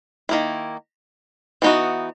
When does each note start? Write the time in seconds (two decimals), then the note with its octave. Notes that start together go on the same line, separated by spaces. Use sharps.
0.29 D#3 A#3 E4
1.62 E3 B3 D#4 F#4